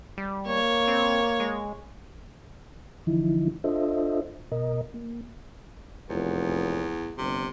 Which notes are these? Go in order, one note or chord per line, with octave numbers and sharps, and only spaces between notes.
G3
A#3 C#5
C4
G#3
D3 E3 F3 D#4 E4
D4 F4 A4 C5 D#5 E5
B2 A#4 D#5
A#3
F1 E2
G1 C3